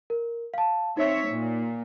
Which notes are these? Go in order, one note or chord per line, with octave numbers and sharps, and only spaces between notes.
A#4
F5 A5
C4 D#4 C#5 E5
A#2